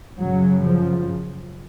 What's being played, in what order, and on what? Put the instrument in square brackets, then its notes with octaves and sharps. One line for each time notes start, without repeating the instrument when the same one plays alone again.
[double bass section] F#2 C#3 F#3
F3